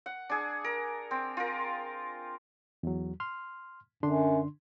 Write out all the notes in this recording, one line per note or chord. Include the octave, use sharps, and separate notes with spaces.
F#5
D4 G#4
A#4
C4
F4 A#4
E2 F#3
C6 F6
F#2 D3 D4 C6